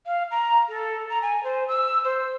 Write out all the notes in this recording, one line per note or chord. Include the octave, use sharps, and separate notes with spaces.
F5
A#5
A4
A#5
G#5
C5
E6
C5